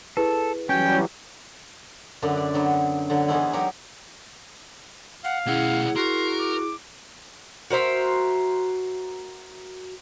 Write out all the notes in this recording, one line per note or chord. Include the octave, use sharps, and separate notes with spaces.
E4 G#4 A4 B4
E3 F#3 G3 C#4 F#4 G5
F#2 D3 D4 B4
D5
D3 F#3 B3
D3 F#3
E3 G#3 B3 C#4 D#4 E4
F#3 D#4 G4 A#4
F5 F#5
B1 C#4 E4 G#4 F#5
F#4 A#4 C6
D6
F#4 A#4 C5 E5